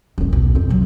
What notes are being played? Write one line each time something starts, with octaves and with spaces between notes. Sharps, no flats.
D#1 A1
B1
F2 C4
C3 F#3